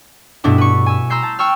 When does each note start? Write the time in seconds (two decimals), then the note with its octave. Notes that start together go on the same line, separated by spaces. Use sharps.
0.44 G2 B2 A3 B3 D4 E4
0.58 B4 C#6
0.86 G#5 E6
1.10 A#5 C6 E6 G6 C7
1.23 A5
1.39 G5 C#6 E6 F6